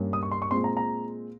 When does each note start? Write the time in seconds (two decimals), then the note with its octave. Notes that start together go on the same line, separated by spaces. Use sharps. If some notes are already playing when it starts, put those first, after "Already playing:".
Already playing: G2 G3 A#3 C#4
0.13 D#6
0.23 C#6
0.32 C6
0.42 C#6
0.51 A#2 G#3 C4 C6
0.64 A#5
0.77 A#5